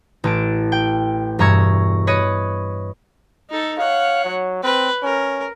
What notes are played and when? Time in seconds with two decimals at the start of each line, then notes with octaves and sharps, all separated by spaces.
0.24 A1 A5 D7
0.72 G5
1.39 E1 G2 E5 A#5 C#6 G#6
2.07 B4 C#5 D#5 B5
3.50 D#4 A4
3.79 C#5 F5 F#5
4.25 F#3
4.63 C4 B4
5.03 C#4 A#4